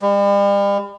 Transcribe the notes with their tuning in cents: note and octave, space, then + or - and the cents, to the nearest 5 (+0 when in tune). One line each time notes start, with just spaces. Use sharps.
G3 +40